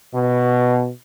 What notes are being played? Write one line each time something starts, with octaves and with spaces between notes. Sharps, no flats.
B2